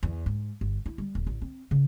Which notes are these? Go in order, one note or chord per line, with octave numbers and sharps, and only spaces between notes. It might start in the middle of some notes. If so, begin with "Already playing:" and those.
E2
G#2
G1
E4
G3
D#1
A1
C4
C#3